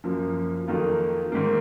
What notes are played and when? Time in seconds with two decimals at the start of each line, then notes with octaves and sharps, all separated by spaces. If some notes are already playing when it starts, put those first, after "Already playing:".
0.04 F#2 F3 A#3
0.68 F2 D#3 F#3 A#3 F4
1.32 G#2 D#3 A#3